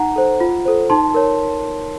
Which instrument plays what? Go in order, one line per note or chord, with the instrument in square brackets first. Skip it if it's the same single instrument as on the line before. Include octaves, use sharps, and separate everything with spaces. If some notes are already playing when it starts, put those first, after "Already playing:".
Already playing: [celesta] D#4 F#5 A#5
A4 C5
F4
A4 C5
D#4 A5 C6
A#4 C#5